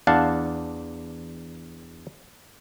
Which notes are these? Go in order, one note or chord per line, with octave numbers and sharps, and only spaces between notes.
E2 D4 F5 F#5 A5